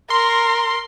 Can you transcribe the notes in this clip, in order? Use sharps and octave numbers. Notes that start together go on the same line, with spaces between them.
A#4 C6